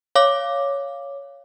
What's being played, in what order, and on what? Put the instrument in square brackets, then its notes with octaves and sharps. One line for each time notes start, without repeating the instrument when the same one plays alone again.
[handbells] C#5 F5 D6